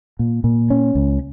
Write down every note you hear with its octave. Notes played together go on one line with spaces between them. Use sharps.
A#2
A#2
C#4
C#2